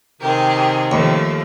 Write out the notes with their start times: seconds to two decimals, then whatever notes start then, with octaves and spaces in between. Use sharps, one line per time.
0.21 C3 D#3 G4 G#4 A#4
0.92 D#2 F3 A3